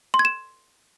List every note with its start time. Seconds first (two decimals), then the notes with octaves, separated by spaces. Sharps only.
0.14 C6
0.19 G#6
0.25 E7